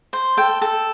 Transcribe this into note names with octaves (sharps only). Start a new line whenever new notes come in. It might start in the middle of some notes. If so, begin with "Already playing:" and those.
C5
A4 G5
A4